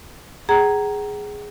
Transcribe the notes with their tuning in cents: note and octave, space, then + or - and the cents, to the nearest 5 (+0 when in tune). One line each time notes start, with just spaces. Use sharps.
G#4 +0 F#5 +40 A#5 +0